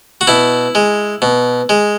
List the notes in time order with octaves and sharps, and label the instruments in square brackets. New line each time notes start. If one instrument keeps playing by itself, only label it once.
[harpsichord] F#4
B2 E4
G#3
B2
G#3